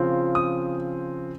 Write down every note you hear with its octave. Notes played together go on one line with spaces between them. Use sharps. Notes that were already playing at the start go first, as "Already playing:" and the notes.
Already playing: C#3 F3 C4 F4
D#6